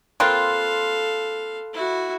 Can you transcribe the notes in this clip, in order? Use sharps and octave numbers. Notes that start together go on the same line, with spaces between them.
A#3 C4 F4 A4 F5 B5 C6 F#6
E4 F#4